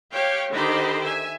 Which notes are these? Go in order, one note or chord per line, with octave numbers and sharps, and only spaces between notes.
G4 C#5 F5 G5
D3 D#3 G4 C5 D#5 B5
E5 G#5